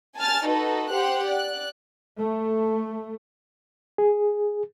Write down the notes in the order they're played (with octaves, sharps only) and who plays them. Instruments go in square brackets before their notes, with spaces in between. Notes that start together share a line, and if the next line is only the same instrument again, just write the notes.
[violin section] G#5 A5 F6 A6
D#4 F#4 A4 B4
G4 C5 F#5 F#6
D5 F#6
[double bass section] A3
[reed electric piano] G#4